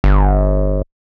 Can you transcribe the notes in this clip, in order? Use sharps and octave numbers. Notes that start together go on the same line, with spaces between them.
G1